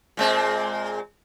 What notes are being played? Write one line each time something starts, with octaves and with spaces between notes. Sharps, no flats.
A#2 G#3 C4